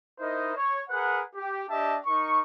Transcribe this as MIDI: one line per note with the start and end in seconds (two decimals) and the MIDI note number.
0.20 0.54 63
0.20 0.54 64
0.20 0.54 70
0.20 0.54 72
0.20 0.54 75
0.56 0.81 73
0.90 1.21 68
0.90 1.21 70
0.90 1.21 71
0.90 1.21 78
1.35 1.62 67
1.69 1.97 62
1.69 1.97 67
1.69 1.97 75
1.69 1.97 76
1.69 1.97 81
2.06 2.41 63
2.06 2.41 70
2.06 2.41 85